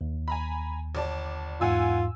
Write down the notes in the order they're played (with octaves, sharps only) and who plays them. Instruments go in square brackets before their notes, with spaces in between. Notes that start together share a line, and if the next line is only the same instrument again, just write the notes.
[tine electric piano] D#2
[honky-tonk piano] G#5 A#5 B5
G1 D5 A5
[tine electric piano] E2 G#2 [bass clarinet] F4 [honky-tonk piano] F#5 G#5 E6